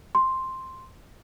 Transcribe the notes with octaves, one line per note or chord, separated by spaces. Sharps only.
C6